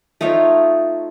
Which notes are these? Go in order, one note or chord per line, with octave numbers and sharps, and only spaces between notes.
A3 D#4 F4 C#5